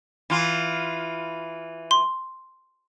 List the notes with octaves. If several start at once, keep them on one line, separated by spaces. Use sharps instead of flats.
E3 F4
C6